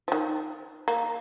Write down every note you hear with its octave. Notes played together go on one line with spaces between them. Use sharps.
F3
D#3
A#3